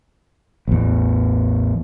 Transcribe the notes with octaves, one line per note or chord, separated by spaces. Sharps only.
A1 E2